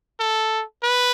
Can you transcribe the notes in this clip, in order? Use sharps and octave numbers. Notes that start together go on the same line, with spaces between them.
A4
B4